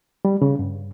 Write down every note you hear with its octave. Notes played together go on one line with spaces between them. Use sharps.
G3
C#3
G2